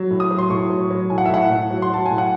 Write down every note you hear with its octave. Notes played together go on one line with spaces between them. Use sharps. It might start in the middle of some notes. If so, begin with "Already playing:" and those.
Already playing: F#3
A2
D#6
F#3
C6
A2 C#6
F#3
F#3
A2 G#5
F#5
E5
A2 F#5
A2
F#3
C6
F#3 A5
A2 G#5
F#5